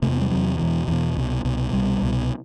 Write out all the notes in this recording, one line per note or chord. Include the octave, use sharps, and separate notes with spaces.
E2 C3 A3
B3
G3
E2 C3 F#3
E2 B2 E3
E2 B2 E3
C2 B2
C2 B2
C2 B2 G3
C2 B2